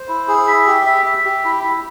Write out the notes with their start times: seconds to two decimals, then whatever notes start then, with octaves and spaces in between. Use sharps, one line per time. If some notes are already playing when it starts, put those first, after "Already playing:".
Already playing: C5
0.08 E4
0.28 G#4
0.47 E5
0.67 G4
0.86 E5
1.06 E5
1.25 G4
1.45 E4
1.64 E4